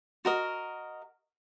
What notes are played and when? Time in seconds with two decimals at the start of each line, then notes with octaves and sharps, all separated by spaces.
0.25 F#4 A#4 D#5